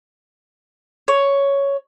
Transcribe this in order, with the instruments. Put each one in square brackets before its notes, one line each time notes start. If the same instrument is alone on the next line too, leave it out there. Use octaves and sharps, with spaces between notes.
[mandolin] C#5